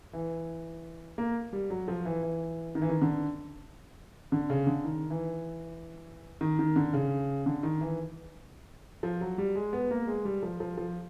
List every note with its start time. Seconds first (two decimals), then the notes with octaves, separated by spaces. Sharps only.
0.13 E3
1.18 A#3
1.53 G3
1.70 F#3
1.88 F3
2.05 E3
2.23 E3
2.75 D#3
2.82 E3
2.89 D#3
3.02 D3
4.32 D3
4.50 C#3
4.67 D3
4.84 D#3
5.10 E3
6.41 D#3
6.59 D#3
6.76 D3
6.93 C#3
7.46 D3
7.63 D#3
7.81 E3
9.03 F3
9.21 F#3
9.38 G3
9.56 G#3
9.73 B3
9.91 A#3
10.07 G#3
10.25 G3
10.43 F3
10.60 F3
10.77 F3